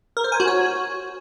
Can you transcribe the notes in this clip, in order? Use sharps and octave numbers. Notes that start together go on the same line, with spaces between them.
A#4
C5
G#5
F#4
C#5